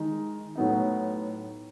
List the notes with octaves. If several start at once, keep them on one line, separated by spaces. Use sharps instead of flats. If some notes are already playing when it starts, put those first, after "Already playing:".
Already playing: D#3 G#3 D#4
A2 F#3 B3 D#4